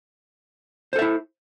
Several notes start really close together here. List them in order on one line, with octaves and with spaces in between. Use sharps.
C5 A4 E5 E4